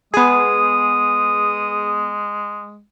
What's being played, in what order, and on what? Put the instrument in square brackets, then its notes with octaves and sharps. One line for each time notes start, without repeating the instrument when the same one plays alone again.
[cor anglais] G#3 [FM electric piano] B3 G#4 [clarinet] D#6